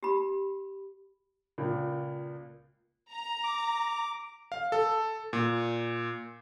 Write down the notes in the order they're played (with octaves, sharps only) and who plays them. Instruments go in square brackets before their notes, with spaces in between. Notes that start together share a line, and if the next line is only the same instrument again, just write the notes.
[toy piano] G4 B5
[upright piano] C#2 A#2 A#3
[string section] A#5
[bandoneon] D6
[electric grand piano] F5
A4
A#2